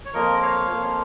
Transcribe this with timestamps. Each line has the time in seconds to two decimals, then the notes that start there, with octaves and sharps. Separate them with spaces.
0.05 C#5
0.13 F2 F3 A#3 A#4 D#5
0.42 C#5 F5
0.70 F2 F3 A#3